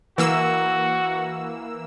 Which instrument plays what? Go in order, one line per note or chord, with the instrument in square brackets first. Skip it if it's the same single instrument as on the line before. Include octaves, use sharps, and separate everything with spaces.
[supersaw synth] E3 A#3 E6 [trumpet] F#4